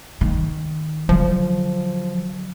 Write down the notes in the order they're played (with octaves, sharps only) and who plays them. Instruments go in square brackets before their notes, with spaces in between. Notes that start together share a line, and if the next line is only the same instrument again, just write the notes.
[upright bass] D#3
[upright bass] D3 F#3 [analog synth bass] F3